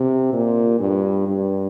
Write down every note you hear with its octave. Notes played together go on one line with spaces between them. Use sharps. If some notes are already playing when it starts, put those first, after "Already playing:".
Already playing: C3
A#2
G2
G2